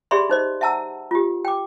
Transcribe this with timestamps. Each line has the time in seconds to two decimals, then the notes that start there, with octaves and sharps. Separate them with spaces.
0.11 G4 G#4 D5 E5 B5 C6
0.29 D#4 C5 D#5
0.61 E5 F#5 A5 A#5 E6
1.11 F4 G4
1.45 G5 D6